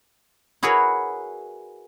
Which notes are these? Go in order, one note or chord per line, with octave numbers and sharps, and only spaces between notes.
E4 F#4 G#4 A#4 B4 C#5